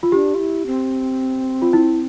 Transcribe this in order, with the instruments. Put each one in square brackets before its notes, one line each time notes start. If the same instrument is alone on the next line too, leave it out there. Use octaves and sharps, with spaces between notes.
[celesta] F4
[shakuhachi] D4 [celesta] G4
[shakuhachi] F4
E4
C4
[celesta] F4
E4